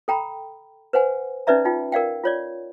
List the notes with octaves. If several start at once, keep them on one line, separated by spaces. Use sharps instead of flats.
A4 G5 A#5 B5
B4 C5 F#5 G#5
C#4 D#4 B4 D5 E5 A#5
D#4 F4 G5
A#4 D5 F5 G5
F4 C#5 D5